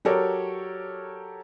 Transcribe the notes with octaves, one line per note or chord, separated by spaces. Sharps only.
F#3 G4 A4 A#4 C#5 D5